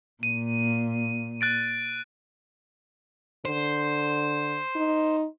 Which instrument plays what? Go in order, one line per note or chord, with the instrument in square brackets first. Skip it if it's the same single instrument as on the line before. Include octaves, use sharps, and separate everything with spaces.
[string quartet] A#2 [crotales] D#7
[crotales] F#6 A6 D7
[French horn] D3 [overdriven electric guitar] C5
[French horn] D#4